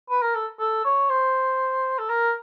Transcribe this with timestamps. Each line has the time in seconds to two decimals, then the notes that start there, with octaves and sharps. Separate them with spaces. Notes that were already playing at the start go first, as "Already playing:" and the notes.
0.10 B4
0.22 A#4
0.35 A4
0.60 A4
0.85 C#5
1.10 C5
1.98 A4
2.10 A#4